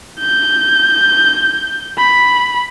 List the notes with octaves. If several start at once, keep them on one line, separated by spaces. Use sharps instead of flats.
G6
B5